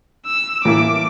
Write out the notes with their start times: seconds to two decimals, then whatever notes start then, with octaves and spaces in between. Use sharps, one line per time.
0.26 E6
0.65 A2 E3 A#3 E4 D6